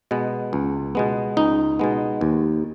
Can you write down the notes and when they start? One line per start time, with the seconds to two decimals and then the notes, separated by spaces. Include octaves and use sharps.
0.11 B2 G#3 B3
0.53 C#2
0.95 B2 G#3 B3
1.37 C#2 D#4
1.79 B2 G#3 B3
2.21 D#2